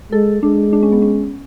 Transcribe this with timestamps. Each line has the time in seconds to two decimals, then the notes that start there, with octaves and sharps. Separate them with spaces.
0.12 G#3 A4
0.42 G#3 D4
0.73 D4
0.83 C#4
0.92 B3
1.02 C#4